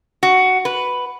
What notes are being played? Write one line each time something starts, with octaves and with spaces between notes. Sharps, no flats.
F#4
B4